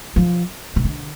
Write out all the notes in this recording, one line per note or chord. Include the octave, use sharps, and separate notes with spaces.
F3
C3
D3